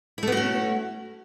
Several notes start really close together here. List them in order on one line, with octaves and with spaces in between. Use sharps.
E4 A3 B3 F#4 C#4